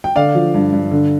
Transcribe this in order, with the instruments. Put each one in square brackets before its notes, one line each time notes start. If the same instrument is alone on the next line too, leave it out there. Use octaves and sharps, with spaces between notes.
[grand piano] G5
D3 D5 F5
F3
G2
G2
D3